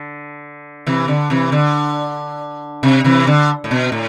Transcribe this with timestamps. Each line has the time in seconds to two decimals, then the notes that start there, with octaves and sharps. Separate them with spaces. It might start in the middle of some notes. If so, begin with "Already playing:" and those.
Already playing: D3
0.87 C3 E3
1.08 D3
1.30 C3 E3
1.52 D3
2.83 C3
3.04 C3 E3
3.27 D3
3.64 A2
3.71 B2
3.92 A2